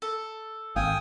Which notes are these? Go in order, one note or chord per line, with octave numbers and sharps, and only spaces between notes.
A4
G#1 F5 G5 G#5 D#6